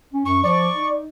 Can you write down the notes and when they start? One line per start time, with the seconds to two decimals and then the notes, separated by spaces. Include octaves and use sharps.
0.13 C#4
0.26 F#2 C#6
0.43 F3 D5 C#6
0.75 D#4